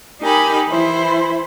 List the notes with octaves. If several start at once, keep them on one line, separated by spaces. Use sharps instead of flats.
D#4 G4 A#4 G#5 B5
E3 E4 C5